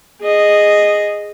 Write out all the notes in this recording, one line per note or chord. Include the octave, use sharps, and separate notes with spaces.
G#4 D#5